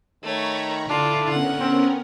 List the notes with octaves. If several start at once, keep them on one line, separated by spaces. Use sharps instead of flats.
D#3 A3 C#5 A#5 B5 C#6
D3 D4 E4 F4
B3 C#4 A#4 F#5
C4